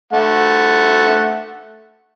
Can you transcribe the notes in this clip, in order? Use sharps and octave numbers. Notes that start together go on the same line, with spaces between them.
A3 F#5